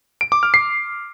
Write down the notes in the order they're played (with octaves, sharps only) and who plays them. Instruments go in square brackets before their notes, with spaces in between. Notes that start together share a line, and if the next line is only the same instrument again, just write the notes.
[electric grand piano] D7
D6
F6
C7